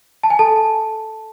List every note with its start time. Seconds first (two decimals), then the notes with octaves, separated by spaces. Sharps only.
0.23 A5
0.30 G#5
0.39 A4 A5